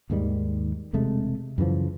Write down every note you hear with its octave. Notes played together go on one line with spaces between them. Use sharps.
D#2 G#2 D#3 G3
E1 C3 G#3 A3
F#2 C#3 E3 F3